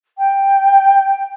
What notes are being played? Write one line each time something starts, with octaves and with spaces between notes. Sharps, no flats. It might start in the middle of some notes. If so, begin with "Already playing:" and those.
G5